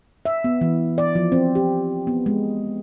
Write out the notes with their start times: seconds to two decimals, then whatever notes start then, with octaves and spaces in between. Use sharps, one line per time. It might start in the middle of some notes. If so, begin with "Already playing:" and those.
0.25 E5
0.44 B3
0.61 E3
0.98 D5
1.15 F3
1.32 C4
1.55 G4
2.07 B3
2.26 G#3